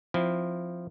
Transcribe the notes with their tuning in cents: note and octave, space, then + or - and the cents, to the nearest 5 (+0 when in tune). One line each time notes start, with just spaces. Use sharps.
F3 +0 C4 +0 E4 +0